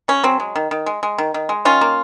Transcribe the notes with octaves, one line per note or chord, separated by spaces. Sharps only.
C#3 C#4
F#3 C4
G#3
D#3
D#3
G#3
G#3
D#3
D#3
G#3
D#3 C#4 F4
A#3